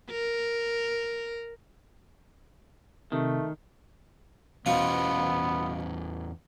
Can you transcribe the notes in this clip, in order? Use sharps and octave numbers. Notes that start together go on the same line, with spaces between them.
A#4
C3 D#3 A3
E2 B2 B3 C#4 F4 C5